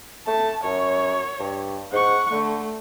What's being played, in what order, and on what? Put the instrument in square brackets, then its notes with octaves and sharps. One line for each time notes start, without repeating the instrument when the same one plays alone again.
[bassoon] A3 [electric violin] A5
[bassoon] F#2 [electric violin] C#5
[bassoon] G2
[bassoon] G#2 [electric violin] F#5 C#6
[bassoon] D3 [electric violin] A3